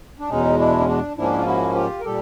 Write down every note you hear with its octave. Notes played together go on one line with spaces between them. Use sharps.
D4
E2 B2 G#3 C#4 D#4
D4 E4
C#4
D4
G#2 F3 A#3 C#4 D4 E4
E4
F4
E4 F#4
F4 G4
A#4
A#2 G3 G4 A4